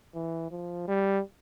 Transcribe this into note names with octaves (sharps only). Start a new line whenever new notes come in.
E3
F3
G3